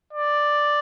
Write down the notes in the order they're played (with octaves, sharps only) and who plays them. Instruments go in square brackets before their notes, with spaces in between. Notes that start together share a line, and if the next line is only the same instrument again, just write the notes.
[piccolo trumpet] D5